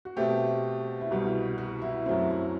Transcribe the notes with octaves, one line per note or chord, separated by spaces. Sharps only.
F#4
B2 A3 C4 G4
E4
C2 B2 G3 F#4
F#4
E4
F#2 F#3 A3 C4 E4
E4